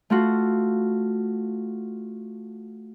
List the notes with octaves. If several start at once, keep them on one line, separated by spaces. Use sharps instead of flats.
A3 F4 F#4